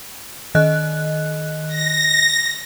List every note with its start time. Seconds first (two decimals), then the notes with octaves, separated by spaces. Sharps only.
0.55 D#3 D#5 F#6
1.67 A#6